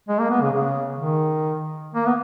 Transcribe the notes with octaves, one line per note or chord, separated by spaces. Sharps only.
G#3
A#3
B3
C#3
C#3
D#3
A#3
B3